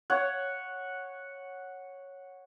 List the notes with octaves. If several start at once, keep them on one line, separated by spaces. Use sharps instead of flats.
C#5 F#5